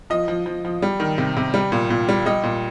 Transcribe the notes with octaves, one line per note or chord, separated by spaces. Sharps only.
F3 D#5
F3
F3
F3
G3
D#3
C3
C3
G3
A#2
A#2
G3
G3 D#5
A#2